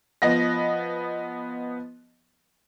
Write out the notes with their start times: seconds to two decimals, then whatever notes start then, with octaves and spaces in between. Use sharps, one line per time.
0.22 F3 B3 D#5 A#6